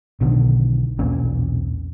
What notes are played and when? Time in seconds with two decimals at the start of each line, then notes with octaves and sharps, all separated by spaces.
0.21 B1 B2 D3 D#3
0.99 B1 E2 A#2 C#4